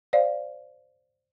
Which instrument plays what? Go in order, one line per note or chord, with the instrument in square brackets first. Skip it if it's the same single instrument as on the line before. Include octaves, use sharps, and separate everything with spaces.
[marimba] C5 D5 F5